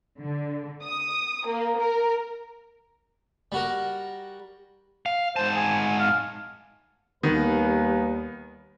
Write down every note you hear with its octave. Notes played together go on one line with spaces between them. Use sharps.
D3
D#6
A#3
A#4
G3 F#4 A#4
F5
G#2 C5 A5
G#5
F5
D#2 D#3 G3 B3 B4